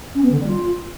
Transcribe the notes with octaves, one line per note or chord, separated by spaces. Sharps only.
C#4
B3
D3
G3
F4